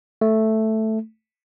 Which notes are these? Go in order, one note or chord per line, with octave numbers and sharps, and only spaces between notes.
A3